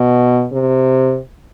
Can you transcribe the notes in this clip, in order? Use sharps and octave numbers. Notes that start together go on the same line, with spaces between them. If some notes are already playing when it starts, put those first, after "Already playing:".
Already playing: B2
C3